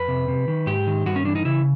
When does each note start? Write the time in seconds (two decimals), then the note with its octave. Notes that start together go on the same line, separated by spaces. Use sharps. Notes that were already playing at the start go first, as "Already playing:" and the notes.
Already playing: F2 B4
0.08 C3
0.28 C3
0.48 D#3
0.67 G#2 G4
0.87 D#3
1.06 G2 F#4
1.16 C#4
1.25 E3 D4
1.36 D#4
1.45 C#3 E4